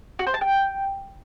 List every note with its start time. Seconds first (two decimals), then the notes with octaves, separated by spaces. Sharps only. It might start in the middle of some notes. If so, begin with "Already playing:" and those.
0.19 F#4
0.27 C5
0.34 A5
0.41 G5